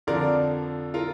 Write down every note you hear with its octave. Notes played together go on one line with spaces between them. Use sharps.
F2 D3 F3 A#4 D5
F4 A#4